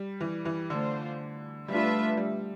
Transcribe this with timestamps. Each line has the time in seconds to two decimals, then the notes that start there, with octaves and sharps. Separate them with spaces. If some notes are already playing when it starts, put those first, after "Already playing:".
Already playing: G3
0.21 E3
0.45 E3
0.70 D3 A3 D4 F4 C5
1.68 G3 A3 D4 F4 B4 E5
2.17 G3